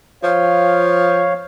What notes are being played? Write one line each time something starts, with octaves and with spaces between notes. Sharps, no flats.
F3 C#5 F5